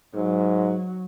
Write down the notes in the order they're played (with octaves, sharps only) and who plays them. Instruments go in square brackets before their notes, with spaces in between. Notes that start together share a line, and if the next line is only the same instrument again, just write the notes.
[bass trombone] G#2 [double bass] F#3